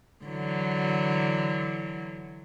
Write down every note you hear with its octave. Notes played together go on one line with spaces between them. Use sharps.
D3 E3 F#3